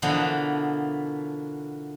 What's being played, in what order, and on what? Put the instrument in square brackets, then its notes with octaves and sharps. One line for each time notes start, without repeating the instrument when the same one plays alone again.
[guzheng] B2 D3 E3 F3 A#3 B3